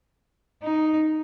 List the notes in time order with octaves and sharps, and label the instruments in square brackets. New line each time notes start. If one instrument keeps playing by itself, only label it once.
[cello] D#4